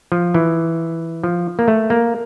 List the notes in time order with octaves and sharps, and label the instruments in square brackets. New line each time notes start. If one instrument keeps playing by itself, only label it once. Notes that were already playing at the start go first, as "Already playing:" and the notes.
[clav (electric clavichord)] F3
E3
F3
A#3
A3
A#3